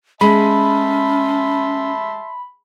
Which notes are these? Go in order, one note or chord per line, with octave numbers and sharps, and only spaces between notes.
G#3 C#4 E5 A5 B5 C6